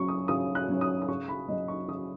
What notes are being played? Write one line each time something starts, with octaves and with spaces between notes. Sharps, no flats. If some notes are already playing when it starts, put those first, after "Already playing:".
Already playing: C#3 F#3 C#4 C#6
D#6
C#3 D#6
F#6
F#3 C#4
D#6
D#6
C#3 C#6
B5
F#3 C#4 D#5
C#6
C#3 D#6